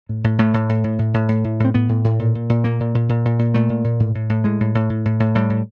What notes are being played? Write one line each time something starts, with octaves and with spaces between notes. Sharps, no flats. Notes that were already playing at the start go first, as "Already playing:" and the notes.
A2
A2
A2 A3
A2
A2
A2
A2
A2
A2
A2
A2 C4
A2 B3
A2
A2
A#2
A#2
A#2
A#2 A#3
A#2
A#2
A#2
A#2
A#2
A#2 A3
A#2
A#2
A2
A2
A2
A2 G#3
A2
A2
A2
A2
A2
A2 G3
A2